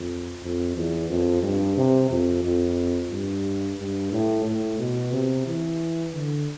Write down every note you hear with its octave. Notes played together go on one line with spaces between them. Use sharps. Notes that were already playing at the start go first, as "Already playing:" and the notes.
Already playing: F2
F2
E2
F2
G2
C3
F2
F2
G2
G2
A2
A2
B2
C3
E3
D3